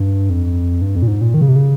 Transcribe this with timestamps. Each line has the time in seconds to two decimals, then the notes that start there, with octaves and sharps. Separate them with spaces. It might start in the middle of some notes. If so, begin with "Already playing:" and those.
Already playing: G2
0.30 F2
0.81 G2
0.95 F2
1.02 A#2
1.07 G#2
1.21 A#2
1.34 D#3
1.41 C#3
1.48 C3
1.56 C#3